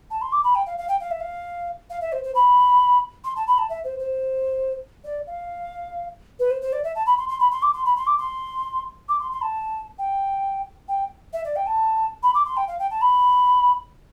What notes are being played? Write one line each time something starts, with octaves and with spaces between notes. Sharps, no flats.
A5
C6
D6
B5
G5
F5
F5
G5
F5
E5
F5
F5
E5
C5
C5
B5
C6
A5
B5
A5
E5
C5
C5
D5
F5
B4
C5
C5
D5
E5
A5
B5
C6
C6
B5
C6
D6
C6
B5
C6
D6
C6
D6
C6
C6
A5
G5
G5
E5
D5
G5
A5
B5
D6
C6
G5
F5
G5
A5
B5